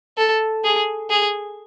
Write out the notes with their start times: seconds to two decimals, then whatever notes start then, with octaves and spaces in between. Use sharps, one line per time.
0.18 A4
0.64 G#4
1.10 G#4